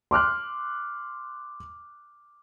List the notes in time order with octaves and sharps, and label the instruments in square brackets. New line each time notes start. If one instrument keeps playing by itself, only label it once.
[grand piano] C6 D6 F6 F#6